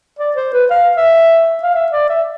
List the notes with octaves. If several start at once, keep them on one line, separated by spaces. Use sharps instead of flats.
D5
C5
B4
F5
E5
F5
E5
D5
E5